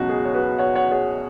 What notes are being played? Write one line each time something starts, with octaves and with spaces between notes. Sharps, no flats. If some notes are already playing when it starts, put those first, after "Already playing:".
Already playing: C#2 B2 F#3 D#4 F#4
G#4
C#5
F#4 B4
C#5 F#5
C#5 F#5
G#4 C#5